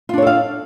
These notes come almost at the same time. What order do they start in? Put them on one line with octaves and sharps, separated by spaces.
F4 D4 C#5 A4 F5